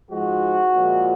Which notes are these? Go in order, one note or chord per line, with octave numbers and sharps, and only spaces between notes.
G#2 F3 G#3 F#4
A#2 F3 G#3